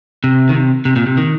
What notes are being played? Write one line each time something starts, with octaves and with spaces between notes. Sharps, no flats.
C3
D#3
C3
C3
A#2
C3
D#3